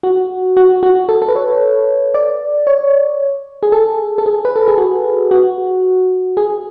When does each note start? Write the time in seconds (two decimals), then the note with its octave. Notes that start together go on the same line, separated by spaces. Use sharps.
0.03 F#4
0.57 F#4
0.83 F#4
1.09 A4
1.22 A4
1.28 B4
1.36 C#5
2.14 D5
2.67 C#5
3.63 G#4
3.72 A4
4.18 A4
4.26 G#4
4.45 B4
4.56 A4
4.68 G#4
4.78 F#4
5.31 F#4
6.37 G#4